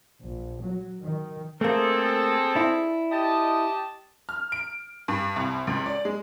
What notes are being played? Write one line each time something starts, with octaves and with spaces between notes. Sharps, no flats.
A#1
F#3
D#3
A3 A#3 C4 G#4 A4
D4 E4
G4 D#5 A5
F6
D7
G2
C2
C#2
D5
G#3